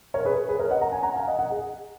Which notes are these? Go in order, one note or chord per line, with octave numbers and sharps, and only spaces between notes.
A#4 C#5
G#4 B4
G#4 B4
A#4 C#5
D#5 F#5
A#5
G#5
F#5 A#5
F5 G#5
D#5 F#5
D#5 F#5
G#4